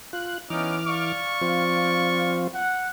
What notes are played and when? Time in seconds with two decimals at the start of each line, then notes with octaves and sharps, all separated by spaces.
0.13 F4 F#6
0.50 E3 B3 C#4 D#4 D6 F6
0.88 D5 F5 C#6
1.41 F3 C4 F4
2.54 F#5